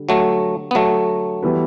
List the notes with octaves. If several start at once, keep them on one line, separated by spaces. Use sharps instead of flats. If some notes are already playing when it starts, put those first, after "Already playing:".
Already playing: D3 G3
F#3 A3
B3
F#3 A3
E3 G3 B3